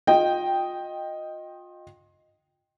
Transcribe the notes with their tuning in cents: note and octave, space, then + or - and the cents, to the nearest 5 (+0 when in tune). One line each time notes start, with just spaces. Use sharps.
F4 +30 D#5 +0 G5 +0